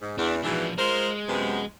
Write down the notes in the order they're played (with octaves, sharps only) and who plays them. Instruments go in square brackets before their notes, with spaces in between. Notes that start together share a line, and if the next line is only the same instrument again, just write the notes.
[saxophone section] G#2
[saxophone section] E2 [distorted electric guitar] D4
[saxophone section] G#2 B2 E3 [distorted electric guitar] F3 D4
[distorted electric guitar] G#3 [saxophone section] F4 A#4 C5
[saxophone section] F#2 C3 B3